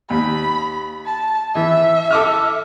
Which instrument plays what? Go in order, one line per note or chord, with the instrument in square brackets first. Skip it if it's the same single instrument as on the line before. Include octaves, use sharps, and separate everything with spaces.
[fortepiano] D#2 [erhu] B5
[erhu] A5
[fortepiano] E3 [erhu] E5
[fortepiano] A4 D6 F6